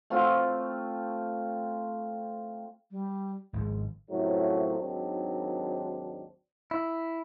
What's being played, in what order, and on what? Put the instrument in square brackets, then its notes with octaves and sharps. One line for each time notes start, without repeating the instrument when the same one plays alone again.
[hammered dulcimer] A3 C4 F4
[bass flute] G3
[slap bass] G#1 D#3 F3 [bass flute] G#3
[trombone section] F#2 A2 C3 F3 F#3
G#1 D#2 F#3 C4 D4 D#4
[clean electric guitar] E4